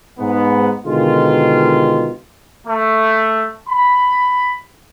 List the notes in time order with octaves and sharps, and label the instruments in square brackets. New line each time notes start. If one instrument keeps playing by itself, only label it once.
[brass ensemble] G#2 B3
B2 D3 D#3 G#3 F4
[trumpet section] A3
B5